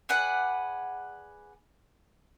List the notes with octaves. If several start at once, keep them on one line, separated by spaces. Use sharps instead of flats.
G#4 B4 D5 F#5